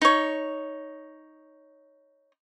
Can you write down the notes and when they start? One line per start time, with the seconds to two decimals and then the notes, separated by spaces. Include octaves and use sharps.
0.02 D#4 C#5